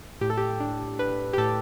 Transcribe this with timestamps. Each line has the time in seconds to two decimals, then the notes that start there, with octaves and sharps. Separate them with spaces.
0.21 A2 G4
0.30 A4
0.37 G4
0.60 D4
0.99 D4 B4
1.33 G4
1.38 A2 A4